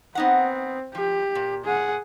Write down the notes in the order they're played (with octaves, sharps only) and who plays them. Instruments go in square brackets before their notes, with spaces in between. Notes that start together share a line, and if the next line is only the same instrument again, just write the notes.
[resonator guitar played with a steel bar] B3 D#4 F#5 [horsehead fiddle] C4
[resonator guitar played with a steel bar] F3 [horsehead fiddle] G4
[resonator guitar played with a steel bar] A#2
[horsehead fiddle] G#4 F#5